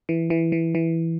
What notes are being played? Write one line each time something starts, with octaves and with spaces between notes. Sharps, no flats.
E3
E3
E3
E3